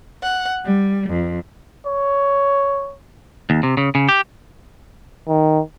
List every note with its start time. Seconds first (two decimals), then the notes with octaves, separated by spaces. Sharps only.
0.22 F#5
0.64 G3
1.10 F2
1.86 C#5
3.50 D#2
3.63 C3
3.77 C#3
3.95 C#3
4.09 G4
5.28 D#3